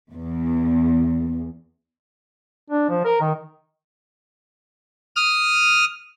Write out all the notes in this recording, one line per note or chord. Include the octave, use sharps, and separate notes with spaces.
E2
D4
F3
A#4
D#3
D#6 F6